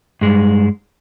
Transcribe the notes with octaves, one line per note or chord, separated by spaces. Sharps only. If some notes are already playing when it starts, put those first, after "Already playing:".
G2 G#3